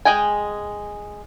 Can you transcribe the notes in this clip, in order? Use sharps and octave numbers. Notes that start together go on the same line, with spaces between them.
G#3 G#4 D#5 G5 G#5